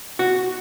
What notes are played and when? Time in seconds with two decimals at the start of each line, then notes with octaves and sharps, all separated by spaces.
0.19 F#4